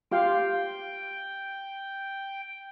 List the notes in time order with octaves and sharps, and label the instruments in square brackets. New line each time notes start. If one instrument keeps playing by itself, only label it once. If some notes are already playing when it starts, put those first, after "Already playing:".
[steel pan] F4 G4 F5 [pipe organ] G5